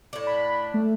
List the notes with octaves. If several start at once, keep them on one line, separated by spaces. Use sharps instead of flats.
A2 D4
B5
A3